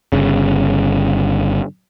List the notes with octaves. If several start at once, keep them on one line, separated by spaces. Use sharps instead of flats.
G1 C#3